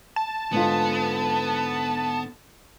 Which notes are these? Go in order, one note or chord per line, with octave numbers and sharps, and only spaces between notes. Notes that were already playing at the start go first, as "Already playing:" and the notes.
A5
G#2 D3 B3 F4